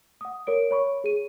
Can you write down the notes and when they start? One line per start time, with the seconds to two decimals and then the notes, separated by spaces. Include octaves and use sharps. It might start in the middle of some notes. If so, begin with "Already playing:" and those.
0.21 F#5 D#6
0.47 A#4 C#5 D7
0.71 C#5 B5 C#6
1.04 G#4 D#7